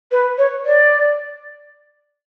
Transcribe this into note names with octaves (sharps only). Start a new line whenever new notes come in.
B4
C#5
D5